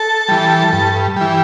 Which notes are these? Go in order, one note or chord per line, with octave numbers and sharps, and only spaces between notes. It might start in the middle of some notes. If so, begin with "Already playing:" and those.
Already playing: A4 A5
E3 G3
G2
E3 G3